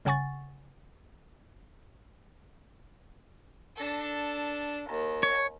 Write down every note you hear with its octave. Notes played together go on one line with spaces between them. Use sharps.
G1 C#3 F#5 G#5 C#6 A6
D4 A4
D#2
C#5